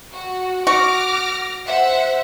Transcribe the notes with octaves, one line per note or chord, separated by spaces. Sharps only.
F#4
F#4 D6 F6 A#6
C5 E5 F#5